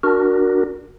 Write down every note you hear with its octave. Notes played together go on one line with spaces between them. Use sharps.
D4 F#4 A#4